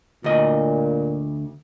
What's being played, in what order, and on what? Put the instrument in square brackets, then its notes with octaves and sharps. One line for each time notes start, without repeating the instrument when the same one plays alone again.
[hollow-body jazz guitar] D2 D#5 [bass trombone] A#2